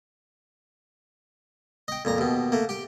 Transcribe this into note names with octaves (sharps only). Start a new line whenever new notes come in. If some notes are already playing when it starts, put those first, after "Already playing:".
D#5 G5
F2 A#2 A#5
D#2 B2
A3 A#3
G4 G5